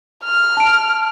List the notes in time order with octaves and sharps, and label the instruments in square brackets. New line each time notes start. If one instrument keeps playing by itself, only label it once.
[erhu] F6
[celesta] A5 D7